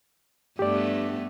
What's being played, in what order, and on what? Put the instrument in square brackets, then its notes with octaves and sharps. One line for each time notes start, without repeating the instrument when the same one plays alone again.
[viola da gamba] G2 A3 B3 [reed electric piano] G4 D5